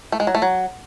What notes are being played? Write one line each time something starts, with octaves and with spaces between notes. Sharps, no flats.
A3
G#3
F#3
A3
F#3